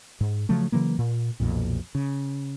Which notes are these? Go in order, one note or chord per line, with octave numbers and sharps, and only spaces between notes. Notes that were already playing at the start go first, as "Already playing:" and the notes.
G#2
C#3 F3 F#3 A3
C#3 E3 F#3 A#3
A#2
B1 F2 A#2
C#3